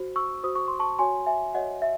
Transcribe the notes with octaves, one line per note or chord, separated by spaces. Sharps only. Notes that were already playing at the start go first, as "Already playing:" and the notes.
Already playing: F#4 C5
C#6 E6
F#4 C5 D#6
C#6
C6
A5 C#6
F#4 C#5 G#5 C6
E5 G#5
F#4 C#5 D#5 F#5
E5